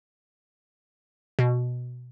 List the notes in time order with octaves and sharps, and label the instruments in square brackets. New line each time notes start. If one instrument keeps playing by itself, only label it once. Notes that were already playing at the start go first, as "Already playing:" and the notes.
[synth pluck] B2